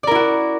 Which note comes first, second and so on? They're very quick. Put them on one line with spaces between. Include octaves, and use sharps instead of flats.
D5 A#4 E4 F#4